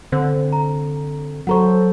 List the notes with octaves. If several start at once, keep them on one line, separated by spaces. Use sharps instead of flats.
D3 C4 C5
A#5
F#3 A4 C5 F#5 A#5 C#6